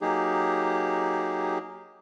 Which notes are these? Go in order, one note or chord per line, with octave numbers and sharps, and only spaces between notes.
F#3 A#3 D#4 G4 G#4